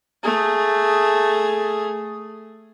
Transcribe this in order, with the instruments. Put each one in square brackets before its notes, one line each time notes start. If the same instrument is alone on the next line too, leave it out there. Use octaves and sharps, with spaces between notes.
[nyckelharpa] A3 G#4